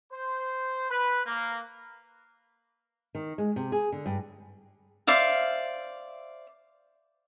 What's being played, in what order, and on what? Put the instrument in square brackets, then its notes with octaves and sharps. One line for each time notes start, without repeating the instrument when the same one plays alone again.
[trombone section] C5
B4
A#3
[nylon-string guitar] D#3
G#3
C3
G#4
D3
G2
[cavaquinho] C5 D5 E5 F5